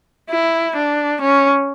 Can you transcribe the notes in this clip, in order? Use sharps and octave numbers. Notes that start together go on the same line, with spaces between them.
E4
D4
C#4